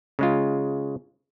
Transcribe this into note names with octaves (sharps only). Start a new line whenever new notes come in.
C#3 G#3 F4